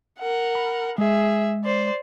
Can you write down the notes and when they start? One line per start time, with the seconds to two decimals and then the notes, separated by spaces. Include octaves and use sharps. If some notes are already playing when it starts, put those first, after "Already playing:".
0.19 A#4 F#5
0.55 B5
0.98 G#3 G#4 E5
1.64 C5 D5